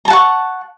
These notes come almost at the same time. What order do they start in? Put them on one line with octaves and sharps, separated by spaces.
A#5 A5 F#5 C#6